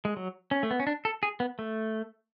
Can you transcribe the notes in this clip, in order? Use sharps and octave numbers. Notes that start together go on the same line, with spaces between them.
G#3
F#3
C#4
A3
B3
C#4
D4
A4
G#4
B3
A3